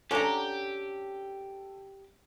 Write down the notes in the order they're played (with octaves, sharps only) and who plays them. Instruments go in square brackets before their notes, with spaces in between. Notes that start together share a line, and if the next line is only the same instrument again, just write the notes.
[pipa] C#4 D4 [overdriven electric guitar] G4 [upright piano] A4 [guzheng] F#5 A#5